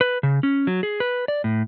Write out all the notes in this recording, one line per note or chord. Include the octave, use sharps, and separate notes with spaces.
B4
C#3
C#4
F#3
G#4
B4
D5
A2